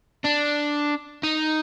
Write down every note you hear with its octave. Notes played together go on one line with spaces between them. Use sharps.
D4
D#4